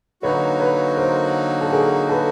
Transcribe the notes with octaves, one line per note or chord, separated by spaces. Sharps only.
D3 F#3 A#3 D#4 F#4 B4 C#5
B4 C#5
A#4 C5
A4
G#4 A#4
A4 B4